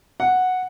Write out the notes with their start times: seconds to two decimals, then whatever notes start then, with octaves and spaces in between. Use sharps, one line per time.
0.20 F#5